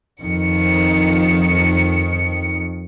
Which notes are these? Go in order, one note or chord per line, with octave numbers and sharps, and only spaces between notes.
F2 D#3 C#7